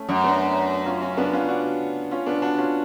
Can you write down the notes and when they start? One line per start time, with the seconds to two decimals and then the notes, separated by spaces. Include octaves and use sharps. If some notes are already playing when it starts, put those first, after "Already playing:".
Already playing: A3 C#4
0.09 F#2
0.24 B3 D4
0.86 C#4 F4
1.01 C#4 F4
1.17 B3 D4
1.33 C#4 F4
1.49 D4 F#4
2.11 C#4 F4
2.26 B3 D4
2.42 D4 F#4
2.58 C#4 F4